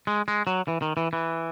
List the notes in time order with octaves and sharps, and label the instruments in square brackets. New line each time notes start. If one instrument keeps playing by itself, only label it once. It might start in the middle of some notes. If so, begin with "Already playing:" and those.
[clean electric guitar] G#3
G#3
F#3
E3
D#3
E3
E3